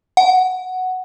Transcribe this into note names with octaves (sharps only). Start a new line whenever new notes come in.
F#5